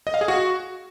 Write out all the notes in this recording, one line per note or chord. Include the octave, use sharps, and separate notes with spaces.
D#5
F5
G#4
F#4